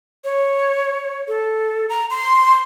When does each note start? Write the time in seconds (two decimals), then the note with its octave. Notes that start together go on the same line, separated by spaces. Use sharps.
0.24 C#5
1.28 A4
1.89 A#5
2.10 C6